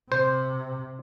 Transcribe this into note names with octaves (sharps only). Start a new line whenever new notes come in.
C3 C5